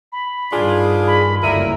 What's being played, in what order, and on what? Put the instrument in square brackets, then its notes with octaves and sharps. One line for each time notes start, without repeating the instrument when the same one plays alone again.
[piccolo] B5
[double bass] G2 D#3 [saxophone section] C4 D4 F4 [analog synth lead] G#4
[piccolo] B5
[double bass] F#1 D2 [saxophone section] F#3 G3 E4 [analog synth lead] A#4 [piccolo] D#7